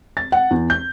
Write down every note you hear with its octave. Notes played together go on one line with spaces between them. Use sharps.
A6
F#5
E2
G6